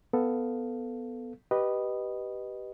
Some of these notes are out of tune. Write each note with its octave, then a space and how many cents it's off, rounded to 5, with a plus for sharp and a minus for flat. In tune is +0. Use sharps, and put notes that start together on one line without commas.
B3 +10 A4 +5 F5 +0
G4 -15 B4 -5 D#5 -10